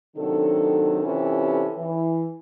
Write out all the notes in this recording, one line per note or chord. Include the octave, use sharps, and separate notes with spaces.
C3 D#3 F#3 D4 A4
C3 E3 C#4 F4 G4 A4
E3